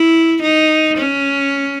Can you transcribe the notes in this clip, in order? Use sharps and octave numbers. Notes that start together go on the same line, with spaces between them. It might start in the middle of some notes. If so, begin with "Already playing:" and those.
Already playing: E4
D#4
C#4